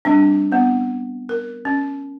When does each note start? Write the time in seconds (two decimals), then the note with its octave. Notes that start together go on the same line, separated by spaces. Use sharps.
0.05 G3 C4 D4
0.52 B3 C4
1.29 A#4
1.65 C#4